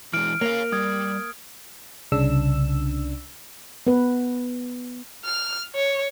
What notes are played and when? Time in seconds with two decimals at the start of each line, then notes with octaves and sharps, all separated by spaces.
0.13 E3 G#3 F6 D7
0.41 A#3 C#5 F5
0.72 G3 D#6 G#6
2.12 C2 C#3 D4 E6
3.87 B3 B4
5.25 F6
5.75 C#5